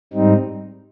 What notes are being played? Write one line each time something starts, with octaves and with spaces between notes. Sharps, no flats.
G#2 G3 C4 D#4